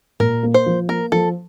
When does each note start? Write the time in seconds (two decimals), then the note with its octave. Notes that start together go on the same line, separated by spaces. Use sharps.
0.20 A#2 A#4
0.43 A#3
0.54 C5
0.66 F3
0.88 A#3 A#4
1.12 F3 A4